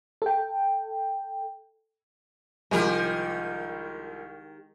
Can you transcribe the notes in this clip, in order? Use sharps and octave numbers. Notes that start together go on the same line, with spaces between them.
A4 G5
C2 D#3 F3 G#3 G4 A#4